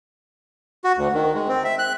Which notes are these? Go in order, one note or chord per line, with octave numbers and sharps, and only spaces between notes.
F#4
D2
D#3
G#3
C4
E5
F#6